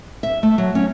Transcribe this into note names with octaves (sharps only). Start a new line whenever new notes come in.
E5
A3
F#3
C#4